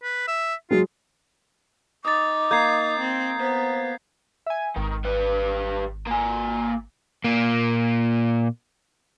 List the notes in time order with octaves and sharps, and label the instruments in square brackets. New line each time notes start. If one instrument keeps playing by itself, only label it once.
[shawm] B4
E5
[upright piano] F#3 G#3 [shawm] F4
[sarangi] D#4 [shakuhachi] D6 [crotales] D#6 A6
[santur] A#3 [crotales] G6 G#6 C7
[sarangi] C4
[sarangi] B3 [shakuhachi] C5
[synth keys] E5 G#5
[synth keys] G#1 [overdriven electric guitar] D#3
[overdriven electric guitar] G3 B4
A#3 G#5
[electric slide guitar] A#2 A#3